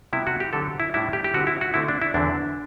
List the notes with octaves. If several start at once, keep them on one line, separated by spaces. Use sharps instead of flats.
C3 G3 B3 E4
F#4
G4
D3 F#3 C4 A4
E4
A2 G3 D4 E4
G4
G4
D3 G3 C4 F#4
E4
F#4
D3 A3 C4 E4
D4
E4
E2 D3 F#3 C4 D4